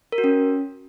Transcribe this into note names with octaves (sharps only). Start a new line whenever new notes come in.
A#4
F#4
C#4